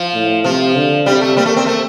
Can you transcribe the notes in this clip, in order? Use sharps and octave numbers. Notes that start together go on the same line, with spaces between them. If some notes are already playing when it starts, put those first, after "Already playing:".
Already playing: F3
A2
C3 F3
D3
C3 G3
A3
G3 A#3
A3
C4
A3